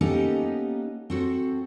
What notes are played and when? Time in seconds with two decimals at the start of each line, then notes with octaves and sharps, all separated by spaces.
0.01 A#3 B3 C#4 D#4 G4 A4
1.10 C4 F#4 A4